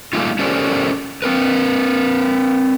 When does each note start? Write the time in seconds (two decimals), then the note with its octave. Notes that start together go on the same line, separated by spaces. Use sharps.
0.13 G3 A3 A#3 D#4 F4
0.39 C#4 G4 A4 A#4 C5 D5
1.22 C4 A#4 B4